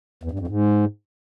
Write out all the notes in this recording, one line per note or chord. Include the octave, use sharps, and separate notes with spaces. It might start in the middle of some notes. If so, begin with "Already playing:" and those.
E2
G2
F2
G#2